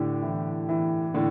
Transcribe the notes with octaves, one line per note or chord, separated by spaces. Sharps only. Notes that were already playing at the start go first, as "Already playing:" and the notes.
Already playing: A2 D3 D4 G4
E3
E3
A2 D3